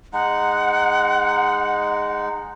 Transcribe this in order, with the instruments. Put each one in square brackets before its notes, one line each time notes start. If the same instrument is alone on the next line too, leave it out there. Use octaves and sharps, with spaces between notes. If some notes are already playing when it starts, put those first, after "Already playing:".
[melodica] G#3 D#4 [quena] F#5